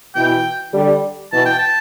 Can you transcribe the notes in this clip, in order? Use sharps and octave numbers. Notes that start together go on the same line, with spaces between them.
B2 E3 G5
D3 G3
B2 E3 A5
G5
A5